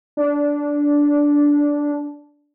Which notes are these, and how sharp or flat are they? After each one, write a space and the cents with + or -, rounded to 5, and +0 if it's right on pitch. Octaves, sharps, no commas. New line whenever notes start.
D4 -10